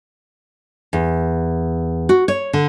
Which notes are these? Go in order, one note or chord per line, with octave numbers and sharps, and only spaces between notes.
E2
F#4
C#5
D3